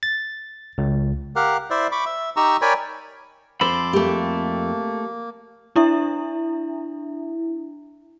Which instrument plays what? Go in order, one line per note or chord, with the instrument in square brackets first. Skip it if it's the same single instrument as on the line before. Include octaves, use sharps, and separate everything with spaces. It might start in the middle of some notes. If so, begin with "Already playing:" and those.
[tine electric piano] A6
C#2
[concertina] G4 A#4 F5 F#5
E4 C5 D5 E5
B5 C#6 D6
E5
D#4 G4 A#5 C#6 E6
A#4 C#5 D5 G5 G#5 B5
[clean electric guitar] F2 A4 B5 [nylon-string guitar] C5 [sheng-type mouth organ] C6 D6
[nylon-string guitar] A3 G4 [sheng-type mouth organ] A#3
[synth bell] D4 E4 E5